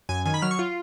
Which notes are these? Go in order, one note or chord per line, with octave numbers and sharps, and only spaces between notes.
F#2 G#5
D#3 G#5
B5
F#3 F6
C#6
F4